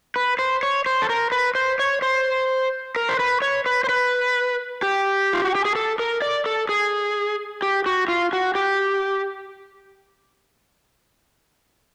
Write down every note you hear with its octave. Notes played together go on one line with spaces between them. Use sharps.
B4
C5
C#5
C5
A4
A#4
B4
C5
C#5
C5
A#4
C5
B4
C#5
B4
C5
B4
G4
F4
F#4
G4
G#4
A4
A#4
D5
A4
G#4
G4
F#4
F4
F#4
G4